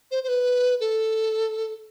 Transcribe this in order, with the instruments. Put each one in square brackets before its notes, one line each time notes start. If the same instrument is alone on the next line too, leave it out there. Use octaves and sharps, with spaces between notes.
[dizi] C5
C5
B4
A4